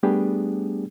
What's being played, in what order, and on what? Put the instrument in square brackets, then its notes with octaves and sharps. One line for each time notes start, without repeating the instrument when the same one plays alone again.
[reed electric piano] G3 A3 B3 D4 G4 G#4